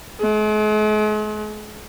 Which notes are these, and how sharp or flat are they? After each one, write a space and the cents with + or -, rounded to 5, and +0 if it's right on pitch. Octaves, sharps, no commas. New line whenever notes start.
G#3 +45